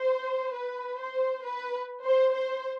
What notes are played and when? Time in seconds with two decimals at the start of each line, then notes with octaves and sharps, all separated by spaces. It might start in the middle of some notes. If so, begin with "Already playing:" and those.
Already playing: C5
0.54 B4
0.99 C5
1.44 B4
2.04 C5
2.34 C5